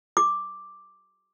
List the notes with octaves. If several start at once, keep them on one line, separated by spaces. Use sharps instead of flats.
D6